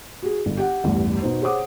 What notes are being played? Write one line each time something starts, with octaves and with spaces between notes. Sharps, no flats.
F#4 G#4
G1
G4 F#5
A1 E2 G2
B2 D#4 C5
G#4 C5 C#5 F#5 D6 D#6